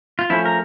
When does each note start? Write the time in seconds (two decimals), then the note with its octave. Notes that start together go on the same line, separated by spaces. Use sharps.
0.19 F4
0.30 F3 A3 C#4 E4
0.46 A#4